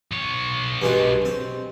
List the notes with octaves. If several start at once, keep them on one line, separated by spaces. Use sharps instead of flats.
B1 C#5
G2 G#3 F#4
C4